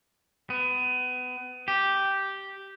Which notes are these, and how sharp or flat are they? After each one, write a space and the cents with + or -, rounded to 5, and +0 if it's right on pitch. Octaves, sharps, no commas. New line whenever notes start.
B3 +25
G4 -5